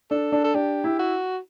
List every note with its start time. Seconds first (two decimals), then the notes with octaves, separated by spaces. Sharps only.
0.11 D4 A4
0.32 D4
0.44 A4
0.54 D4 G4
0.84 E4
0.99 F#4